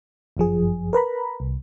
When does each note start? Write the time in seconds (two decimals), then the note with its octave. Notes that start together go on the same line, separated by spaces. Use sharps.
0.37 G1 F#2 F3 G#4
0.93 A#4 B4 A#5 B5
1.40 C2